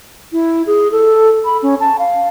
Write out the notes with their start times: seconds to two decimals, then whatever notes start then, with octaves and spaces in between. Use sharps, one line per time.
0.32 E4
0.67 G#4
0.92 A4
1.45 B5
1.62 C#4
1.80 A5
1.99 F5